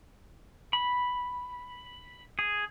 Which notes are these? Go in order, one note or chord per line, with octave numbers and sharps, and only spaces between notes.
B5
G#4